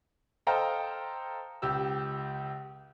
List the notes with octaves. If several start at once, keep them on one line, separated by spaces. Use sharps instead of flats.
A4 C5 D#5 F5 G5 A#5
C#2 G4 E6